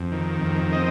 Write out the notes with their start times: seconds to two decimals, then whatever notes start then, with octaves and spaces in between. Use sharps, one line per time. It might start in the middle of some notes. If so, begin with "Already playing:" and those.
Already playing: F2
0.12 D#3
0.42 F2
0.73 C4 D#5